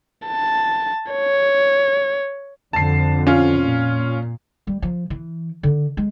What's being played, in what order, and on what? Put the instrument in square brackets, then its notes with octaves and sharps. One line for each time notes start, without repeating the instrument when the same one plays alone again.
[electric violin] A5
C#5
[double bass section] F2 D3 [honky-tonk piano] A5 C7
[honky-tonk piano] C#4 F4
[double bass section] A#2
[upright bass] G3
F3
E3
D3
G#3